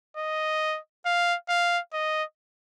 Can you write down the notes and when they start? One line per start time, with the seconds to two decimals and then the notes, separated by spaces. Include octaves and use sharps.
0.17 D#5
1.05 F5
1.49 F5
1.93 D#5